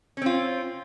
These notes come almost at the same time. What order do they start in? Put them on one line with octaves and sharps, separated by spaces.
C#4 C4 F4